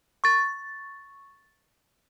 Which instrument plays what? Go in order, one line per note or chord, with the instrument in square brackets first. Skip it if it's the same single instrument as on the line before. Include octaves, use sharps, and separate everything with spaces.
[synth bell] C#6 A6